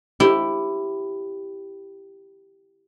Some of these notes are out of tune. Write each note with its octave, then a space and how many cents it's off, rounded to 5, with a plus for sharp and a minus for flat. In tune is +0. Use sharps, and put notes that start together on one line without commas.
E4 +10 G4 +0 C5 +0